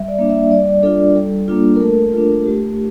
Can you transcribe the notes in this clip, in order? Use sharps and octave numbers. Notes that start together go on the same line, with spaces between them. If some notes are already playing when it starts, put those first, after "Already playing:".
Already playing: G3 E5
D5
A#3 D4
E5
G3 D5
D4 F4 A4
G3 A4
A#3 D4 F4
A#4
A3 A4
D4 F4
A3 G4